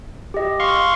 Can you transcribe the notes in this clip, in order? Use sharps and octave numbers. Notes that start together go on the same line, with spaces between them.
G4 D#5
F5 C6 C#6